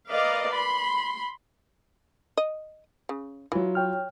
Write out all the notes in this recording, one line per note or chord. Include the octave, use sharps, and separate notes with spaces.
A#4 B4 D5 D#5 F5
B5 C6
D#5
C#3
E3 F#3 F4
C#5 G5 F6